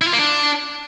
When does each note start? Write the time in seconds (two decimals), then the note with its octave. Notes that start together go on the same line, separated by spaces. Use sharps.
0.01 E4
0.07 F4
0.13 A#3
0.19 D4